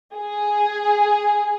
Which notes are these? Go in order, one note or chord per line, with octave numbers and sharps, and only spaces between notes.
G#4